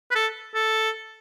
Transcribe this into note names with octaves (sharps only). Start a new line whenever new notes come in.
B4
A4
A4